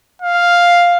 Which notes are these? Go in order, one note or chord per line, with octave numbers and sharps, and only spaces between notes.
F5